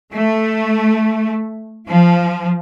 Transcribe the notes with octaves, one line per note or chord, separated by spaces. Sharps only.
A3
F3